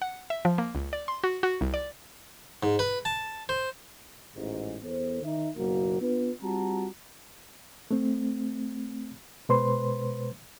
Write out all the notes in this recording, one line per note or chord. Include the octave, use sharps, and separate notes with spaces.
F#5
E5
F3
A#3
C#2
D5
C6
F#4
F#4
C2
D5
G#2
B4
A5
C5
A1 G#2
E2 B3 A4 C5
D#3 D#4 E5
F#1 B1 F#3 A#3 F#4
B3 D4 F4 B4
G3 C4 F4 F#4 A5 A#5
A3 C4
B2 G#3 B4 C5 C6